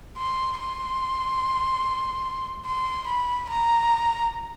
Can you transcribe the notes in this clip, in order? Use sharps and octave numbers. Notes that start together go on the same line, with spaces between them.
C6
C6
C6
B5
A#5